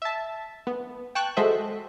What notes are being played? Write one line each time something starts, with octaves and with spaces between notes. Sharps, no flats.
E5 A5
B3
G5 A5 C#6 F#6
G#3 F#4 A4 C5 D#5 E5